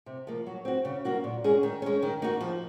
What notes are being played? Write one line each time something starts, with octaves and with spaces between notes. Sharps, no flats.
C3
F3 A#3
F#3
C4 F#4
C#3
F#3 A#3 C#4 F#4
A#2
G#3 C#4 G#4
D#3
G#3 C#4
D#3
A#3 D#4 F#4
F3